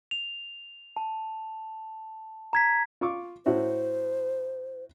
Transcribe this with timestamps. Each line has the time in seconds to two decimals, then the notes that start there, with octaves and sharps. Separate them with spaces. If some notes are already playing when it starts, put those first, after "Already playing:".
0.11 F7
0.97 A5
2.53 A#5 G#6 B6
3.01 F4 C#6 D6
3.46 A2 F#4 C5 E5